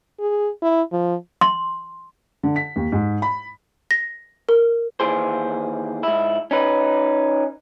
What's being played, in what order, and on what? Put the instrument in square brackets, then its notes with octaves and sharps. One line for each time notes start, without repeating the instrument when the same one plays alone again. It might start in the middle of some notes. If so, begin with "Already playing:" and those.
[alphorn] G#4
E4
F3
[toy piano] C6
[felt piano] D3
B6
D#2
G#2
B5
[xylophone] A#6
A#4
[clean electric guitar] D#2 E3 G#4 C5
G#2 E4
C#4 D#4 B4